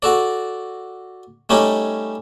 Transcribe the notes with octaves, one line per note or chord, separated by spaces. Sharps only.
F#4 A4 D5
G3 A3 C#4 D#4 G4